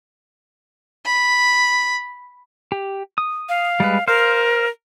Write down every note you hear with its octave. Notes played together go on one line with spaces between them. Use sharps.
B5
G4
D#6
F5
G3 G#3 B4
A#4 C5 F5